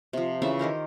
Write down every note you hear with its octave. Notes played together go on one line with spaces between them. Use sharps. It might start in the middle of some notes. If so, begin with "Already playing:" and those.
C3 F3
C#3 E3 C#4 E5
D#3 G4 A#4 C5